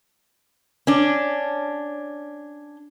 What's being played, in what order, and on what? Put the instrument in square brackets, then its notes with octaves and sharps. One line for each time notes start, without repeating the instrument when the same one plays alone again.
[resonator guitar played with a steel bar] C#4 D4